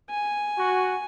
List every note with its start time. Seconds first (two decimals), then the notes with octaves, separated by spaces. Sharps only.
0.10 G#5
0.59 F#4